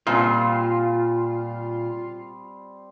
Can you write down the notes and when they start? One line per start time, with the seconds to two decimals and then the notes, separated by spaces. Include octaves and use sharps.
0.07 A#2 G3 C4 F4 A5